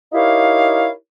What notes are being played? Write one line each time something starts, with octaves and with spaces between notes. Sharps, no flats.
D#4 E4 G4 A#4 C#5 F5